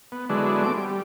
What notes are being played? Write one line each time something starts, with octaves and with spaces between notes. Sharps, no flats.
B3
D3 F#3 G#3 B3 D4 E4
A3 C4 D6
G3